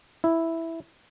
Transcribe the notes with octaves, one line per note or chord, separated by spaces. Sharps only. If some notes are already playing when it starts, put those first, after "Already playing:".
E4